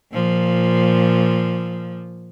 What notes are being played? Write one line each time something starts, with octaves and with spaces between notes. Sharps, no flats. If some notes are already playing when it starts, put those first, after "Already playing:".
A#2 F3